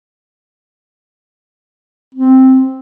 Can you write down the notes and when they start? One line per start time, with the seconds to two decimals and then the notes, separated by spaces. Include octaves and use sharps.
2.15 C4